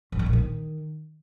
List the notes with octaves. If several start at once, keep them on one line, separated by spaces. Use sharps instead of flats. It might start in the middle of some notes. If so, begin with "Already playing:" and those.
G#2
E3
A#2
D#3